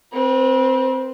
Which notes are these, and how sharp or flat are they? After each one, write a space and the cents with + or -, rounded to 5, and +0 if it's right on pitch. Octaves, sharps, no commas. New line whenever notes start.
C4 +0 B4 -35